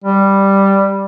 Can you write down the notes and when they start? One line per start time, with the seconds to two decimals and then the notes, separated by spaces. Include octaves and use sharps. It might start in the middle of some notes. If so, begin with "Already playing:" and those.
0.04 G3